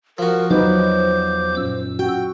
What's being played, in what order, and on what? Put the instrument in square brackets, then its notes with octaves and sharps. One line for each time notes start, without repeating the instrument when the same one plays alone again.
[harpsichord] F3 F#4 [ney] A#4
[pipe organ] E2 D6 G6 [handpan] F#3 D#4 B4 [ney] C5
[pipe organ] F#2 A#2 E6
[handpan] F#4 [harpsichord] G5